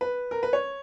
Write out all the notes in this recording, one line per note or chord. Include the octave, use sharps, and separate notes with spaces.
B4
A#4
B4
C#5